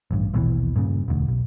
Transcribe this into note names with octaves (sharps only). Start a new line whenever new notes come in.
A1 G2
A#1 D#2 B2 E3
G2 A#2 C#3
E1 D2
B1